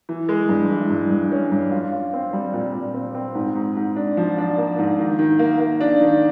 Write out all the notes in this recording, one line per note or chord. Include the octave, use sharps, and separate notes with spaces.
E3
G#3
G2
E3
G2
G2
C#4
G2
F4
F4
C4
G3
A#2
A#2
C4
C4
G#2
G#2
G#2
D4
F3
D4
A#3
G#2
D#3
D#3
A#3
A#3
D4
D#3